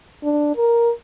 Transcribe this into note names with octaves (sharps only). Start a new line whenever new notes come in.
D4
A#4